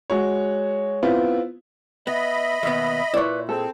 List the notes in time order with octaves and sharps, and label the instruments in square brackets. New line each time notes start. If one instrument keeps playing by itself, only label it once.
[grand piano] G#3 F#4 C#5
B3 C4 E4 F4
[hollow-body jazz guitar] B3 [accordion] D#5 B5 [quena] E5
[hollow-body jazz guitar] D#2 B2 B3
[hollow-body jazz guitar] A#2 E4 [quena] B4 [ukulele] C#5 D5
[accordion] C4 [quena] G#4 [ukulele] A4